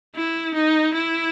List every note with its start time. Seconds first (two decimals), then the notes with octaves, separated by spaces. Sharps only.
0.15 E4
0.54 D#4
0.94 E4